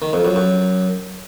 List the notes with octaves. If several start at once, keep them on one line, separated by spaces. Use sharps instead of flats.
D#3
F2
F#2
F#2